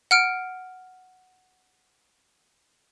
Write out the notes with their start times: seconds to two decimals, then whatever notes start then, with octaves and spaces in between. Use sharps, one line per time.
0.11 F#5 F6 D7